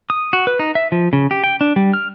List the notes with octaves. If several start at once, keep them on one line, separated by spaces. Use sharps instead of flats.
D#6
F#4
B4
D#4
E5
F3
C#3
G4
G5
D4
G3
F6